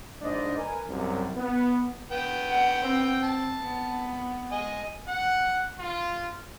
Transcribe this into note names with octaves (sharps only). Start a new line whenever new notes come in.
A#1 G#2 D4 C5 D#5
A#4 B4 G#5
C2 F#2
B3
B3 G5
F#5
C4
A5
B3
D#5 G#5
F#5
F4